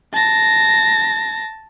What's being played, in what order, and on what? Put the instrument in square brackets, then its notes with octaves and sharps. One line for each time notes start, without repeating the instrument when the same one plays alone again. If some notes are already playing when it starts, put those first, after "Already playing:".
[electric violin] A5 A#6